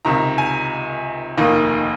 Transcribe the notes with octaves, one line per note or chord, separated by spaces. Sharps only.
C#2 C3 D#3 A#5
G#5
F1 D#2 D#3 A#3 D#4